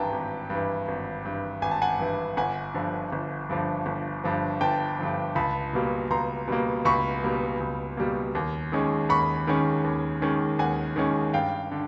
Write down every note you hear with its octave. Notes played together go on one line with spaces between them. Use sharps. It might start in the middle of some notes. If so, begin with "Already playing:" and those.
Already playing: G#1 G2 E3 G5 A5 A#5
G#1
G2 E3
G#1
G2 E3
G#1 G#5
A5
F#5 G#5
G2 E3
G1 F#5 G#5
G2 D3 F3
G1
G2 D3 F3
G1
G2 D3 F3
G1 G5 A5
G2 D3 F3
C#2 A5 B5
B2 G3 A#3
C#2 A#5 C6
B2 G3 A#3
C#2 B5 C#6
B2 G3 A#3
C#2
B2 G3 A#3
D#2
D#3 G#3 C#4
D#2 B5 C#6
D#3 G#3 C#4
D#2
D#3 G#3 C#4
D#2 F#5 G#5
D#3 G#3 C#4
G2 F5 G5
D3